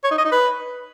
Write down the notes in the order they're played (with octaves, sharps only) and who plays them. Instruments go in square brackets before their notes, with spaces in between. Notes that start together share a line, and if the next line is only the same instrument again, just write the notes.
[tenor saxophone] C#5
D#4
D#5
D#4
B4